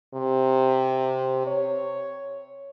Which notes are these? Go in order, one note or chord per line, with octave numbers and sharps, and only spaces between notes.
C3
C#5